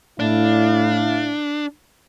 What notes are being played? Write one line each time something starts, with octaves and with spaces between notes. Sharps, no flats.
A2 D4 E4 F5